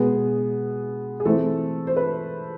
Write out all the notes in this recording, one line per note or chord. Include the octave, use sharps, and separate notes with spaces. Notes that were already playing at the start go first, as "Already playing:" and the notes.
Already playing: B2 G#3 B3 G#4
G#4
E3 A3 C4 A4
C5
B4